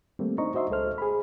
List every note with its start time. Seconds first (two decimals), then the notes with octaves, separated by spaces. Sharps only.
0.19 D#3 G3 A3 A#3 C4
0.38 D4 D#4 C5 D#5 A#5 C#6
0.54 F#4 C5 D#5 E5 C6
0.70 C#2 G#3 A4 C5 F6
0.98 G#4 B5